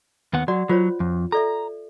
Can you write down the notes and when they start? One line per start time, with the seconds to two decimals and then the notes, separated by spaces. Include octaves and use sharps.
0.33 D#2 B3 F#5
0.48 F#3 F#4 D5 F#5
0.69 F#3 F4 C5 C#5
1.00 F2
1.32 A4 D5 E5 A#5